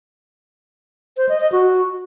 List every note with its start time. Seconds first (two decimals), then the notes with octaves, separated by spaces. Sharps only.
1.17 C5
1.29 D#5
1.40 D#5
1.52 F#4